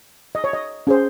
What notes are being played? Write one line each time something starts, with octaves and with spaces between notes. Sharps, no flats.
D#5
C#5
D#5
C#4 G#4 C5